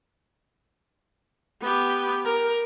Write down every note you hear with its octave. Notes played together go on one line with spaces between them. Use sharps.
B3 G4
A#4